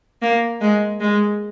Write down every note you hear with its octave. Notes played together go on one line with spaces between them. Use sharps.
A#3
G#3
G#3